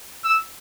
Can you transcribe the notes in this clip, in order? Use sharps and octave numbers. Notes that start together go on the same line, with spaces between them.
E6